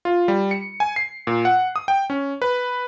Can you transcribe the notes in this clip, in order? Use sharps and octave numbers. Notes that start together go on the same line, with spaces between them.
F4
G3
C#7
G#5
C7
A#2
F#5
D#6
G5
C#4
B4